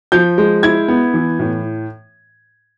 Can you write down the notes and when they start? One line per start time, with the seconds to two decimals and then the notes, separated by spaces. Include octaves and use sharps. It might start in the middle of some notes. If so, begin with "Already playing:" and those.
0.12 F3 G6
0.38 G#3
0.63 E4 G#6
0.88 B3
1.14 E3
1.39 A2